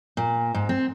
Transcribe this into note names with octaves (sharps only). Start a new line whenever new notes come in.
A#2
G#2
C4